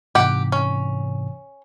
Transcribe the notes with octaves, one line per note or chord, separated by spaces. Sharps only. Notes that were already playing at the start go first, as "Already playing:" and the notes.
G#2 C3 E3 G4 F#5
C#4